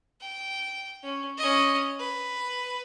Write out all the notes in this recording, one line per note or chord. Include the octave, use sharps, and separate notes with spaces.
G5
C#4
C#4 D#5
B4